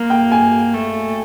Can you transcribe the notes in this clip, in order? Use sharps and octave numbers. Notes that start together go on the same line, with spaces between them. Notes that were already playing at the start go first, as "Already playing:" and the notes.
Already playing: A#3
G5
G#5
A3